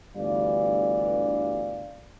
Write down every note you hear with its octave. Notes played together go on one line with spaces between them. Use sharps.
G1 D2 G2 E3 D5 F5